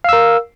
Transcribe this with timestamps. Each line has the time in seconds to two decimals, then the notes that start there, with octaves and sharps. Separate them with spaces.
0.04 F5
0.09 E6
0.13 A#4